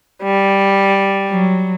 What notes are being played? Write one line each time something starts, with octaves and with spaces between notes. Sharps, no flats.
G3
F#3